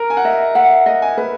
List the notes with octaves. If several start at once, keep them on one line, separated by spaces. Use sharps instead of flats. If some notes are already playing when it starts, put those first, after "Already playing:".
Already playing: A#4
G#5
F#5
D#5 E5
E5 F#5
D#5
G#5
B4